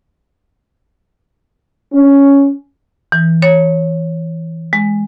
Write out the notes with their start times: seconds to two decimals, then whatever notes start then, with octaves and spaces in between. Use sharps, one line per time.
1.93 C#4
3.12 E3
3.42 C#5
4.73 G#3